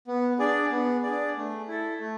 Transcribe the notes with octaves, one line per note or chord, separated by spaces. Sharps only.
B3
D4 G#4 D5
B3
D4 G#4 D5
A3
E4 A4
A3